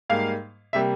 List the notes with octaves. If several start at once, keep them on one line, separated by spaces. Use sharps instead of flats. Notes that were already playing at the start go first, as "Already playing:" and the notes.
G#2 G3 A#3 F5
C3 G3 A#3 E5